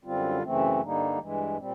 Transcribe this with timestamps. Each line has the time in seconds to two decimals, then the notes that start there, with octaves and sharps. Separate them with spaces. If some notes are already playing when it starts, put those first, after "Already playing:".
0.04 F#2 D3 G3 C4 F4
0.42 F#2 C#3 E3 A3 C4
0.81 G2 D3 G3 A#3 D#4
1.20 G2 E3 G#3
1.57 A#2 G3 C4